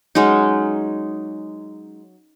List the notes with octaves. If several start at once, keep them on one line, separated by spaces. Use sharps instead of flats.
F#3 G#3 C#4 D#4